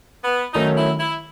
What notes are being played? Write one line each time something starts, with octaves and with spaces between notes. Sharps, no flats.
B3
D#3 F#3 A3 C#4 D#4
E4
E4